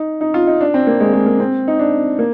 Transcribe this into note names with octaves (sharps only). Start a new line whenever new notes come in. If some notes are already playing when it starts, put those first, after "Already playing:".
Already playing: D#4
D#4
F4
D#4
D4
C4
A#3
G#3
G#3
A#3
C4
D#4
D4
A#3